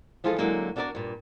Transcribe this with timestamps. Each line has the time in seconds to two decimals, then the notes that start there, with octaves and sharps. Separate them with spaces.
0.24 E3 F3 G#3 F4 G#4 A4
0.38 D3 F#3 G#3 A#3
0.76 A#3 D4 F#4 G4 A#4 D5
0.95 G2 A#2